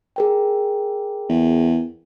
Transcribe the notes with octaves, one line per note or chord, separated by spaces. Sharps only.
G#4 A#4 G5
E2